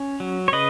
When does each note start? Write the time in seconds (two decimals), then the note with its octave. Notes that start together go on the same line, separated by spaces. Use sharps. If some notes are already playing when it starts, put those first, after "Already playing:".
Already playing: C#4
0.20 F#3
0.48 C#5
0.52 C#3 B4 D#5